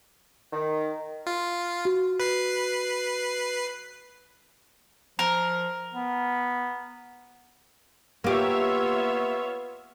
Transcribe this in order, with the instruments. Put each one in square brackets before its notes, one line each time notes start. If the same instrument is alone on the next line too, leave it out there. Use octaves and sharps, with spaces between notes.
[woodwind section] D#3
[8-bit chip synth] F4
[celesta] F#4
[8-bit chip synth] B4 C7
[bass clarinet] F3 [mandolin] A#4
[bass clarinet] B3
[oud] A#3 G4 [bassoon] B3 [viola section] F4 C#5 E5